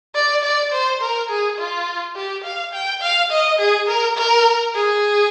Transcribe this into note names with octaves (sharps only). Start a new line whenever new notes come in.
D5
D5
C5
A#4
G#4
F4
G4
F5
G5
F5
D#5
G#4
A#4
A#4
G#4